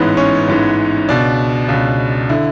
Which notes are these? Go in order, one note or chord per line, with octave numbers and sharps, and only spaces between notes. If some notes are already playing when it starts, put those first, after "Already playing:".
Already playing: A1 G#2 E3 B3 B4
C#4 C#5
A1 G#2 E3
C#2 B2 D4 D5
C#2 B2
D3 E4